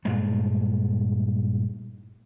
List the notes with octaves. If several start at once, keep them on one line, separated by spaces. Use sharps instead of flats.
G2 A#2 G#3 A3